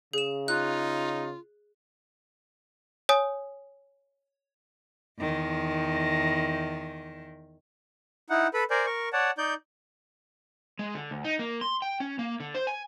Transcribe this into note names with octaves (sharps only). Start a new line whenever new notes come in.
C#3 G#4 E7
D#4 F4 F#6
C#5 G#5 D#6
E2 D#3
D#4 E4 F#5
A4 B4 B5
A#4 C5 D5 G#5
A#4 C#6
C#5 D5 F#5 A5
D#4 D5 G6
G#3
D3
D2
D#4
A#3
C6
G5
C#4
A#3
D3
C5
G#5